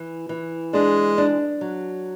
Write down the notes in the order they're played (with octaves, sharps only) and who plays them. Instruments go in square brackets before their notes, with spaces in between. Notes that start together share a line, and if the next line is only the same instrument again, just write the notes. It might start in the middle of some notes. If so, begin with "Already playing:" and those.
Already playing: [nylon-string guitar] E3
E3
[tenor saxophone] G#3 [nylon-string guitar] D4
[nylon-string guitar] D4
F#3